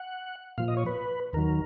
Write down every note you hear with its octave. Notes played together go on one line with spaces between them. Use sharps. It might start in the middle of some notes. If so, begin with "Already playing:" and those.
Already playing: F#5
A#2 F3 F5
D#5
C#5
B4
D#2 D#3 F#3 A#4